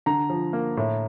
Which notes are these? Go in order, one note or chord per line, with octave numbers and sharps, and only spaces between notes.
D3 A#5
F3
A#3
A2